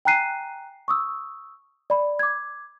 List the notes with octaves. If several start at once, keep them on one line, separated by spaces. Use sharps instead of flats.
G5 G#5 A#5 F#6 C7 D#7
C#6 D#6 E6
D5 B5
D6 G#6